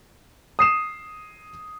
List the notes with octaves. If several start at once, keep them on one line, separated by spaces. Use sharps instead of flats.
D#6 C7 E7